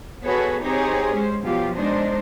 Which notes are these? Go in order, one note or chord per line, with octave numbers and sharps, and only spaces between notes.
B3 F#4 G#4 A4 B4 C#5
C4 D#4 G4 G#4 C5 C#5
G#3 C#4 C5
B2 F3 F#3 F4 G4
G#3 D4 D#4 C5